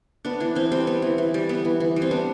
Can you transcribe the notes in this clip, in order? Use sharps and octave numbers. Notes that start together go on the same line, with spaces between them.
B3 D4
E3 D4
E3 C4
G3 C4
B3
E3
E3
G3
B3
E3
E3
G3
C4
B3 D4